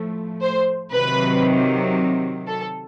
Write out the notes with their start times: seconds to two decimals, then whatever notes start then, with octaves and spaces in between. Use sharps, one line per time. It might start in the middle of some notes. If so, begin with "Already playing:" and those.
Already playing: A2 F3 A3
0.41 C5
0.92 C3 D#3 F#3 B4
2.47 A4